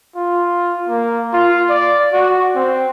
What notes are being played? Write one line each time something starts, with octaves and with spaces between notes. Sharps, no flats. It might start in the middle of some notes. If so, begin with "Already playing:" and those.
F4
A#3
F4
D5
F#4
C4